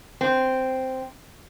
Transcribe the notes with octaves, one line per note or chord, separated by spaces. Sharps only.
C4